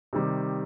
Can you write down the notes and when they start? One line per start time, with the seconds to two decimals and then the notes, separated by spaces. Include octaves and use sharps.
0.13 C3 D#3 G3